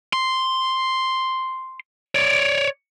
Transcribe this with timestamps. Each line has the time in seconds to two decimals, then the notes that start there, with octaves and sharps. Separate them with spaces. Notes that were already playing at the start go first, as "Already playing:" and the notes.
0.13 C6
2.15 C#5 D5